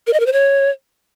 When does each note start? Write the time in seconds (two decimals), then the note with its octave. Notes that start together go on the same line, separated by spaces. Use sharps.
0.07 A#4
0.13 D#5
0.20 A#4
0.26 C5
0.33 C#5